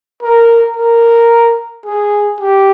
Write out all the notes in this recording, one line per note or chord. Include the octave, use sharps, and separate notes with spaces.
A#4
A#4
G#4
G4